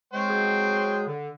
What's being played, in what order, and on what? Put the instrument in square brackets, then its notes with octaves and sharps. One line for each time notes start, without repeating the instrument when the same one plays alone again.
[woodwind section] G#3 [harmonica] C5 C#5 G5
[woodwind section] F#3 G#3 G#4
D3